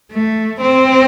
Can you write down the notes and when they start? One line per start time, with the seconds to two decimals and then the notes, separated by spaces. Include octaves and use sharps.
0.12 A3
0.61 C4